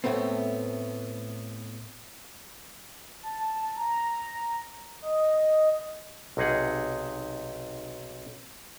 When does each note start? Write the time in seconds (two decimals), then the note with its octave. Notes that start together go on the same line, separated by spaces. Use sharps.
0.04 A2 A3 B3 C4
3.23 A5
3.76 A#5
5.02 D#5
6.37 B1 C3 D#4 G#4 F#5